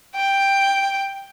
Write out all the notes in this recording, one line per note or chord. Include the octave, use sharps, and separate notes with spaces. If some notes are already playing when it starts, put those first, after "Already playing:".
G5